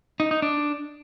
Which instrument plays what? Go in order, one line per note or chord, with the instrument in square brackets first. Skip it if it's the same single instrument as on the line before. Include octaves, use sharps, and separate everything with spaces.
[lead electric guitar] D#4
D#4
D4